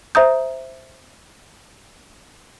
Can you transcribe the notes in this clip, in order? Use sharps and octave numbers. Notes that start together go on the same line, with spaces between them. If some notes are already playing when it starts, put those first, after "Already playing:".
C5 E5 A#5 D#6 G6